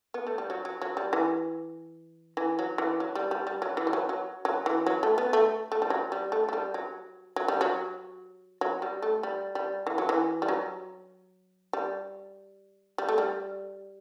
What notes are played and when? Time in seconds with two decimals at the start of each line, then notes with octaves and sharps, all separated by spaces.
0.14 B3
0.27 A3
0.38 G3
0.50 F#3
0.65 F#3
0.82 F#3
0.97 G3
1.13 E3
2.37 E3
2.59 F#3
2.78 E3
3.00 F#3
3.15 G3
3.31 G3
3.47 G3
3.62 F#3
3.77 E3
3.87 G3
3.93 F#3
4.09 F#3
4.45 F#3
4.66 E3
4.86 F#3
5.03 A3
5.18 B3
5.33 A3
5.72 A3
5.82 G3
5.90 F#3
6.12 G3
6.32 A3
6.49 A3
6.53 G3
6.74 F#3
7.36 F#3
7.48 G3
7.61 F#3
8.61 F#3
8.82 G3
9.02 A3
9.23 G3
9.55 G3
9.87 E3
9.98 F#3
10.09 E3
10.42 G3
10.48 F#3
11.73 G3
12.98 G3
13.09 A3
13.18 G3